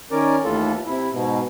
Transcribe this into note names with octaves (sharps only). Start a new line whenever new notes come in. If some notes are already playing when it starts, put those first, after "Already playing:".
D#3 C#4 A#4 D5
D#2 A2 E3 F4 A4
C3 E4
G#2 B2